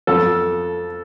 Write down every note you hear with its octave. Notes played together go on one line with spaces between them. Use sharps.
F2 F3 A4